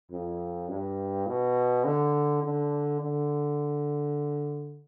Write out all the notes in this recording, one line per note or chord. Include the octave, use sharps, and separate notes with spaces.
F2
G2
B2
D3
D3
D3